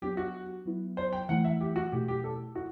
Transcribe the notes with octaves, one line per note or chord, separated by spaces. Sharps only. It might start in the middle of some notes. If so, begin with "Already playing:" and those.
F#3 B3 D4 G4
F#4
F#3 B3 E4
C5
G5
E3 A3 E4 F#5
E5
G4
F#4
B2 A3 E4 G4
G4
A4
E4 F#4